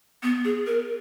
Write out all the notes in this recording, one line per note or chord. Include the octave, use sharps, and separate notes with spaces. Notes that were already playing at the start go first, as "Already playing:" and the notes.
B3
G#4
A#4